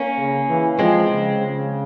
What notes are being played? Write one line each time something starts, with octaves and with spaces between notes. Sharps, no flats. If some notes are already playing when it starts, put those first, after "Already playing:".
Already playing: A#3 C#4
C#3
E3
F3 G#3 C4
C#3
C#3